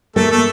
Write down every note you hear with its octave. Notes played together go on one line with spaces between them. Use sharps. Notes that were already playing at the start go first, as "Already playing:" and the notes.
A3 A#3 A4
A3 A4